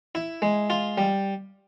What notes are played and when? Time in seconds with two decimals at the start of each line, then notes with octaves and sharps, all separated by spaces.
0.15 E4
0.42 G#3
0.70 F4
0.98 G3